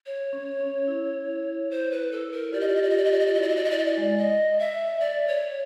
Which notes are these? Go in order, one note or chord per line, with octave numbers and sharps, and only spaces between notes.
C#5
C#4
C#4
E4
C5
B4
A4
A#4
F4 G4 D5
D#5
D5
D#5
D5
D#5
D5
D#5
D5
D#5
D5
E4 F#4 D#5
D5
D#5
E4 F#4 D5
D#5
D5
D#5
D5
G#3
D#5
E5
D5
C#5